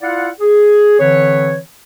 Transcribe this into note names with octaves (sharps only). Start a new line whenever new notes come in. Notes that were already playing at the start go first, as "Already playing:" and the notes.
E4 F4 D5 F5 F#5
G#4
D3 E3 C4 B4 C#5